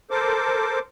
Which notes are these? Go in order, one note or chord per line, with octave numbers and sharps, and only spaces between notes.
A4 A#4 C5 D6